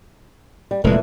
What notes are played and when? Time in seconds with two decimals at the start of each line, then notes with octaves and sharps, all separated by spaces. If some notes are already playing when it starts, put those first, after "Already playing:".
0.71 G3
0.84 F1 A#2 E3 G#3 A3